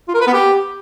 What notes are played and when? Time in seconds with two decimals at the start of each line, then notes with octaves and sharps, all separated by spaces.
0.08 F4
0.14 A#4
0.21 B4
0.27 B3
0.33 G4